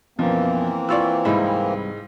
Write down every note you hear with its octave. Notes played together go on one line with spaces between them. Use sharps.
F#2 B2 E3 F3 A#3 C4
E4 F4 D5 C6 C#6 E6
C2 G#2 G3 D#4 E4 G#4